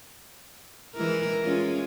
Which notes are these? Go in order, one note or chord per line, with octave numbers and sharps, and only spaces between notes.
E3 G#3 A#4
G#3 C#4 F4